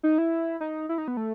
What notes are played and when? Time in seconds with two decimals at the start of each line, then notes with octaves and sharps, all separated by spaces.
0.03 D#4
0.18 E4
0.61 D#4
0.89 E4
0.98 D#4
1.08 B3
1.17 A3